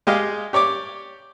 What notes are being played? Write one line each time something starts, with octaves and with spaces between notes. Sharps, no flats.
G#3 G4 G#4 D#5 F5
G4 C#5 D5 D6